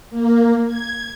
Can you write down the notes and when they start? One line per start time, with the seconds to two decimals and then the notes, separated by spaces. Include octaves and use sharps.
0.11 A#3
0.66 G#6